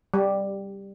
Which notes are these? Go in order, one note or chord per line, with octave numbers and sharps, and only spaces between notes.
G3